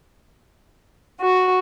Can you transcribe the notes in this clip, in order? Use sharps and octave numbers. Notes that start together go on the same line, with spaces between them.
F#4